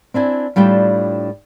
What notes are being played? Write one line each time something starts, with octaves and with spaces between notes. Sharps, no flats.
C4 D4 E4 G#5
A2 G3 D4 F4 G5